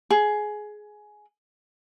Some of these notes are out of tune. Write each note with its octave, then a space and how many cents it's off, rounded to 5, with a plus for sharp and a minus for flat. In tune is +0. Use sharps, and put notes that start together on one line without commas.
G#4 +15